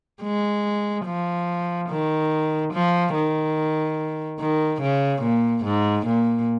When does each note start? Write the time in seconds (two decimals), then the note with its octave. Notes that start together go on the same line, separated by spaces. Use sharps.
0.22 G#3
1.05 F3
1.89 D#3
2.73 F3
3.14 D#3
4.39 D#3
4.81 C#3
5.22 A#2
5.64 G#2
6.06 A#2